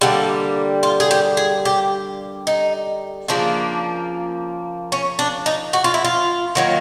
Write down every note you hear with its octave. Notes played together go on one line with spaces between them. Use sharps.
D3 G3 A#3 A4
F4
G#4
G4
G#4
G4
D#4
C#3 F3 A#3 D4
C#4
D4
D#4
F#4
F4
E4
F4
D#3 F#3 A#3